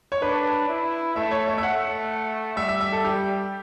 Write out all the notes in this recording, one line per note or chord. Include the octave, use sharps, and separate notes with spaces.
C#5
D4 B4
E4
A3 E5
C#5
E5
E5
A3 F#5
G3 E5
E5
E5
A4
G4